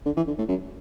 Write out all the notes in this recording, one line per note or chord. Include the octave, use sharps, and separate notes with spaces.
D3
E3
D3
A2
F#2